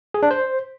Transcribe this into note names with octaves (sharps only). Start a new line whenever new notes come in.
G#4
D4
C5